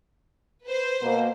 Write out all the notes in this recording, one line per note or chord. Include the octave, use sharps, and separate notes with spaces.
B4 C5
B2 A#3